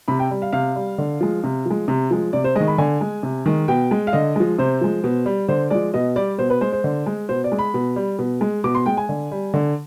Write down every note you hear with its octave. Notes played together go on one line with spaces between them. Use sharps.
C3 B5
G5
G3
F5
C3 F5
G3
D3
F3 G#3
C3
F3 G#3
C3
F3 G#3
C3 D5
C5
D#3 G#3 D#5
B5
D3 G#5
G#3
C3
D#3 G#3
B2 G5
G#3
F5
D3 D#5
F3 G#3
C3 C5
F3 G#3
B2
G3
D3 C5
F3 G#3 D5
B2 D#5
G3 D5
B2 C5
B4
G#3 C5
C5
D3
G#3
B2 C5
D5
G#3
B5
B2
G3
B2
G#3
B2 D6
C6
G#3 G5
G#5
D3
G3
D3